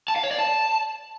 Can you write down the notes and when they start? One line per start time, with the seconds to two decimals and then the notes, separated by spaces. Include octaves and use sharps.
0.08 A5
0.16 F5
0.23 C#5
0.31 D5
0.39 A5